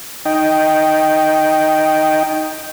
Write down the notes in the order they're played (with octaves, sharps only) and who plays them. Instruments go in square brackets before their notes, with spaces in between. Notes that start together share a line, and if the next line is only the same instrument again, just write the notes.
[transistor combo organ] D#4 D#5 G5